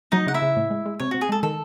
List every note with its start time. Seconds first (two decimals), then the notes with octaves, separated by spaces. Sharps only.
0.12 F#3 D#4 D#5
0.27 C#3 F#5
0.34 E4 E5
0.42 C#3
0.56 A2
0.70 G#3
0.86 G#3
1.00 C3 C#5
1.11 C3 F#4
1.21 G#4
1.29 G#3 A4
1.43 D#3 A4